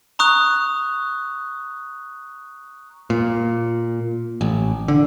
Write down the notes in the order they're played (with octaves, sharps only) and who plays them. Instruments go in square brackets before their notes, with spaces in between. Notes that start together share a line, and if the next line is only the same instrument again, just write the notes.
[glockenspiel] A#5 C#6 D#6 F#6
[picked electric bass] A#2
A1
D3